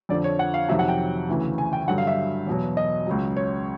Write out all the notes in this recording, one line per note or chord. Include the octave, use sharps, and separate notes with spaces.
F2 D3 F3 D5
C#5
F#5
F5
F2 C3 D#3 F#3 E5
F#5
G5
D2 C#3 E3
G#5
G5
G2 D3 F#3 F#5
F5
E5
E2 B2 F#3
D#5
C#2 C#3 F#3
C#5